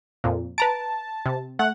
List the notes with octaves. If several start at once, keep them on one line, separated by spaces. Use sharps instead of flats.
F2 A#2
B4 A5 A#5 D7
C3
A3 F#5